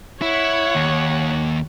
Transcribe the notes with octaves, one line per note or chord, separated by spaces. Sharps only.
E4 C#5 F#5
D#2